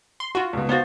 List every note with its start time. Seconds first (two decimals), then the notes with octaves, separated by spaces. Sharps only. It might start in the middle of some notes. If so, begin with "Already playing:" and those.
0.20 C6
0.35 F4 F#4 F#5
0.53 C#2 B2
0.69 B3 F#4 C5 F5 A6